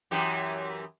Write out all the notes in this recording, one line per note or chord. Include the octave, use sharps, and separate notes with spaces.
F#2 E3 G4